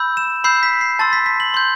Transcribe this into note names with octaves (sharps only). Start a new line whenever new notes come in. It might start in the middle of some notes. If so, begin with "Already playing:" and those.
Already playing: B5 E6 G6
E7
B5 E6 G6 C7
B6
C7
A5 C6 E6 A6
B6
B6
F#7
C6 G6